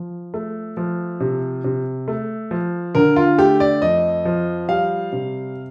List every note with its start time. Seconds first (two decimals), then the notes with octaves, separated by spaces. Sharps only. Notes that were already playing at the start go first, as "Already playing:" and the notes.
Already playing: F3
0.34 A3
0.77 F3
1.20 C3
1.64 C3
2.08 A3
2.51 F3
2.95 D3 A#4
3.16 F4
3.38 A3 G4
3.60 D5
3.81 F2 D#5
4.25 F3
4.69 G3 F5
5.12 C3